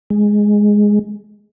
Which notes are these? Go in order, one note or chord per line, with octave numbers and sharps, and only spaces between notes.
G#3